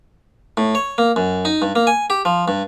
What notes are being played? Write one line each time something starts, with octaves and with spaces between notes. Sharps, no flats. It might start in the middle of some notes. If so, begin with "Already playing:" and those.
A2
C#5
A#3
F#2
D#4
G2
A#3
G#5
G4
F3
G2